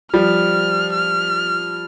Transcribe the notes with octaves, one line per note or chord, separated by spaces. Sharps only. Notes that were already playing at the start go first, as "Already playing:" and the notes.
F3 G3 F6
F6